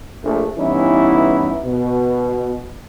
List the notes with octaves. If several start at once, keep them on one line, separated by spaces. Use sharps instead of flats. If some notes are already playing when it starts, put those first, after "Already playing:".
A#1 A3
G2 E3 B3 C#4 D#4 E4
B2